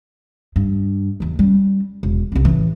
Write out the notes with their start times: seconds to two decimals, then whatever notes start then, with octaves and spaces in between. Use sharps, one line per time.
0.56 G2
1.20 D#2 E3
1.39 G3 C#4
2.03 E1
2.32 C2 D4
2.45 A1 E3